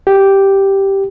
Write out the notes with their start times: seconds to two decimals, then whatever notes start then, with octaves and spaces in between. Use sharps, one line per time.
0.07 G4